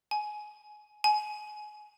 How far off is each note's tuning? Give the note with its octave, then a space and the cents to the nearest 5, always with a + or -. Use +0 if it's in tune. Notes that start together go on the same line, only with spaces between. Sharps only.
G#5 +20
G#5 +25